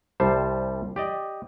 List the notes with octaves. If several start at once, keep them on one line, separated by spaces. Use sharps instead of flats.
C2 G3 C5 A5
G4 D5 D#5